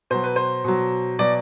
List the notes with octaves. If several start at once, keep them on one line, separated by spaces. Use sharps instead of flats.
B2 F#3 C5
B4
C5
B2 F#3
B2 F#3 D5